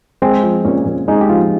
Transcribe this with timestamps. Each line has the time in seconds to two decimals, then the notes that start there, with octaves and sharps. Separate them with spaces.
0.22 G#3 C4
0.43 F3
0.65 A#2 C#4
0.86 A#2
1.08 G#3 D#4
1.21 G4
1.29 F3 F4